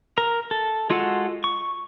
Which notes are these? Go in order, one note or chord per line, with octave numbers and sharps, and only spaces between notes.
A#4 A#5
A4
G#3 F4 F#4 A4 F#5
C#6